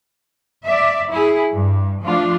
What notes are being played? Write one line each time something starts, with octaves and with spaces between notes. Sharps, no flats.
D5 E5
E4 G#4
G2
F3 A3 D4 F4